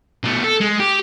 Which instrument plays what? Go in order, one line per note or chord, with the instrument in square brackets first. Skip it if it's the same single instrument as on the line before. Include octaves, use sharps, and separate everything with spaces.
[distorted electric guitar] B2 A3
A4
G#3
G4